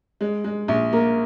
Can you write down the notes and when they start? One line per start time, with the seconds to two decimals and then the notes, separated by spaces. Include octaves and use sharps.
0.21 G#3
0.44 G#3
0.68 A#1
0.93 A#3